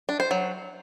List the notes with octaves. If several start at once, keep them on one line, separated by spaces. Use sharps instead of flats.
D4
C5
F#3